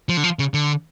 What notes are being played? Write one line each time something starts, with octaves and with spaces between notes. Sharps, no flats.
F3
D3
F3
C#3
D3